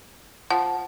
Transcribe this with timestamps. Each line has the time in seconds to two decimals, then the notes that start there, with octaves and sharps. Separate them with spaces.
0.50 F3 F#5